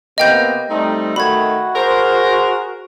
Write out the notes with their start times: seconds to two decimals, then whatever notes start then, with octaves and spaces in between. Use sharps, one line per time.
0.18 C3 A#3 B3 D#5 G5 G6
0.69 G3 A3 C4 D#4
1.16 D#3 A3 F#4 B5 G#6
1.75 G#4 A#4 C5